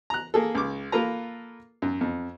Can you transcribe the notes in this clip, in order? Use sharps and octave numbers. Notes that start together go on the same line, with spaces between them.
A#5 F#6
A#3 G#4 A4
C#2 D6
A#3 F4 A4 B4 A#5
F#2
F2